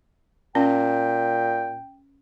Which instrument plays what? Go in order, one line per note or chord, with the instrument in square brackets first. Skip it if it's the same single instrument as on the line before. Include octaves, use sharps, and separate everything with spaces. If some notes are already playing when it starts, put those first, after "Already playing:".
[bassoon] A#2 [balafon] C#4 [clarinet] G5